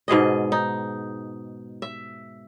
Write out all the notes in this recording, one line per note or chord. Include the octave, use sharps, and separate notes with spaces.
G#2 B2 G#4 D#5
D#4
E5